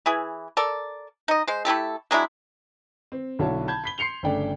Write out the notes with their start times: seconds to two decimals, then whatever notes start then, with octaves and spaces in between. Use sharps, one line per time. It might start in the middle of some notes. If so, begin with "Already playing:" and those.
0.06 E3 E4 G#4
0.57 A4 A#4 D5
1.28 D#4 D#5
1.48 G#3 C5
1.65 A3 E4 G4 A4
2.11 F#3 G#3 D4 E4
3.12 C4
3.39 B1 D3 E4 F#4 C#5 A5
3.68 A5 B5 G6 G#6
3.84 B5 B6 G7
3.98 C6 C7 C#7 F7 G7
4.23 G1 C#3 A3 D4 G5